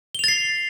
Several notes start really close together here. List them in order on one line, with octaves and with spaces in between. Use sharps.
G7 F7 A6 C7